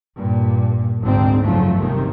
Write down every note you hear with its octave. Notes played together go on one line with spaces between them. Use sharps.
G2 A#2
G#1 D2 G#2 D3 C4
F#1 F3 F#3 A3
G1 C3 D#3